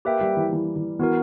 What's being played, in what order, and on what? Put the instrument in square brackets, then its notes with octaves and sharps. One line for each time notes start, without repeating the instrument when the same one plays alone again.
[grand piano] A#3 [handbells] G4 B4 E5 G5
[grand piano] G3
E3
E3
E3
[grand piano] E3 [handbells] B3 F#4 A#4